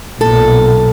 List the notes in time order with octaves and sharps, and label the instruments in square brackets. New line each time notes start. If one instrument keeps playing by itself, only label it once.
[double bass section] B1 A#2 [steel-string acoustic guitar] A4